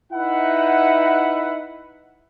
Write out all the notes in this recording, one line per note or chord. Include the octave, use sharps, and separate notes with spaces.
D#4 E4 B4 E5 F#5